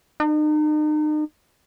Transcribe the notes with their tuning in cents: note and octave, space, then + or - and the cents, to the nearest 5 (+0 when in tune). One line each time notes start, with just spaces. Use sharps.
D#4 -40